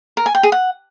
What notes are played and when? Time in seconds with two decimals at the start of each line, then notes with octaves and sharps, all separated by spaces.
0.17 A#4
0.26 G#5
0.35 G5
0.43 G#4
0.52 F#5